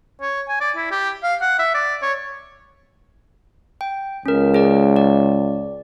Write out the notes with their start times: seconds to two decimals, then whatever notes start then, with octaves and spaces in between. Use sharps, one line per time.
0.21 C#5
0.48 G#5
0.60 D5
0.76 E4
0.91 G4
1.23 F5
1.41 F#5
1.59 E5
1.74 D5
2.02 C#5
3.81 G5
4.26 C#2 C#4 A#4
4.54 G#4 D5
4.96 D5